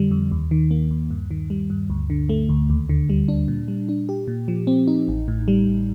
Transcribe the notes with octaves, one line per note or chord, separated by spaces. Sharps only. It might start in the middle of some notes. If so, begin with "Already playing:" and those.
Already playing: F2 D3 G3
F2
D#2
D#3
A#3
D#2
G2
D#3
G3
G2
D2
D3
A3
D2
D#2
D3
G3
D4
A#2
G3
D4
G4
A#2
F3
C4
D#4
A1
A2
G3
A1